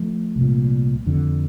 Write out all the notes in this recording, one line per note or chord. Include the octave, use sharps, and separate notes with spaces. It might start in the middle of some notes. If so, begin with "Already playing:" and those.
Already playing: F3 A3
C2
A#2
F2 D3